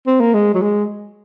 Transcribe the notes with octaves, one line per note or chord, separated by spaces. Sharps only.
C4
A#3
G#3
F#3
G#3